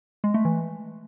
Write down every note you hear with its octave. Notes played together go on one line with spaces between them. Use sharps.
G#3
A3
E3